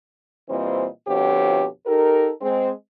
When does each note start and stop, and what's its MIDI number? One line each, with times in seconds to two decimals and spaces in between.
0.49 0.87 46
0.49 0.87 52
0.49 0.87 55
0.49 0.87 60
0.49 0.87 72
0.49 0.87 75
1.08 1.66 41
1.08 1.66 47
1.08 1.66 50
1.08 1.66 53
1.08 1.66 67
1.08 1.66 73
1.87 2.30 63
1.87 2.30 67
1.87 2.30 69
1.87 2.30 70
2.42 2.71 56
2.42 2.71 60